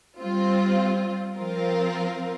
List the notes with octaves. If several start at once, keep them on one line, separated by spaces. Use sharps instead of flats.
G3 C4 F4
F3 C4 F4 A#4